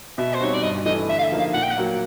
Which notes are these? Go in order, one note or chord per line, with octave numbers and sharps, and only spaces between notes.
B2 E5
C5
G3 C4 D#4 F#4 C#5
D5
G2 D#5
E3 A3 D#5
D3 E5
F5
E5
F3 A#3 D#4
F5
A#2 F#5
G5
F#5
F#3 A#3